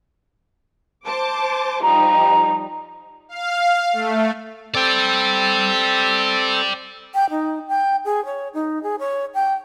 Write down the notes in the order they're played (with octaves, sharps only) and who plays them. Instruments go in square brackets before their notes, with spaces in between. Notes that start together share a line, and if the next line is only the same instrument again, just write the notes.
[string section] C5 A5 D6
[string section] F3 G3 D#4 [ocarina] A#5
[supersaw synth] F5
A3
[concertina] C4 A4 [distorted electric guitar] D5 G5
[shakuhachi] G5
D#4
G5
G#4
C#5
D#4
G#4
C#5
G5